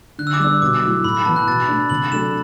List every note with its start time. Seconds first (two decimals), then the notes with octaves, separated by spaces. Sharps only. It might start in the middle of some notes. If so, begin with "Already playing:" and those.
0.18 D3 F#6
0.27 E6
0.34 D6
0.39 G3 B3 D4 E6
0.62 B2 D6
0.82 F#3 A3 E4
1.04 A2 B5
1.15 B5
1.25 E3 B3 A5
1.36 F#6
1.47 B2 A6
1.68 A3 D4
1.90 C3 F#7
2.12 F#3 A3 D4 A4 E7